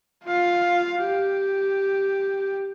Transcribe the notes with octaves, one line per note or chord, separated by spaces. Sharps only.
F4 F5
G4